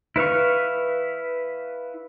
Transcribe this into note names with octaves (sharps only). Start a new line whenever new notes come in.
E4 B4 F5 C#6